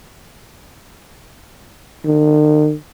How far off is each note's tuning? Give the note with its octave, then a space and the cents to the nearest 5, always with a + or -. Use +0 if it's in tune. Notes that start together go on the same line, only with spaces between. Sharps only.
D#3 -45